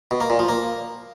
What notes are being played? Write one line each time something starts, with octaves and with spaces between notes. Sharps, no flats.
B2
A#3
A#2
F3
A#3